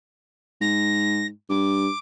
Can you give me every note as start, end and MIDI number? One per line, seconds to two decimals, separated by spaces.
0.61 1.29 44
0.61 1.27 94
1.50 1.88 43
1.50 1.99 86